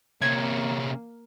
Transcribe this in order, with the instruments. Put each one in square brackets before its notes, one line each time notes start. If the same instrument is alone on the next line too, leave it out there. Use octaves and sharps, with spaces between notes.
[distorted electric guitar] C3 C#4 [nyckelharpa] A#3 [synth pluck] G#6